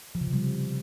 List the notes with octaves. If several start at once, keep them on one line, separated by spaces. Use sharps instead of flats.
F3
C#3
C3
G3